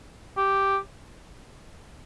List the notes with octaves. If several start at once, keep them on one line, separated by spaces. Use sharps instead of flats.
G4